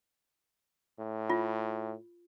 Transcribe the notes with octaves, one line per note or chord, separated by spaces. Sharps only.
A2
F4